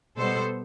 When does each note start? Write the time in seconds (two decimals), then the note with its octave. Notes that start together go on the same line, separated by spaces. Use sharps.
0.17 B2 G3 B3 A4 C5